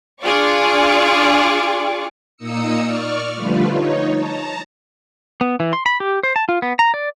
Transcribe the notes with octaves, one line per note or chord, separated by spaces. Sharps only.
D4 F4 G#4 D5 C#6 D6
A#2 A#3 D#4 D#6 E6 C#7
D5 C#6 F6
D3 F3 G3 A3 F4 B4
D#4 C#5
A5 A#5
B3
E3
C6
B5
G4
C5
A5
F4
B3
A#5
D5